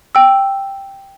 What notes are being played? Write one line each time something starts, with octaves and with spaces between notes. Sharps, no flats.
G5 E6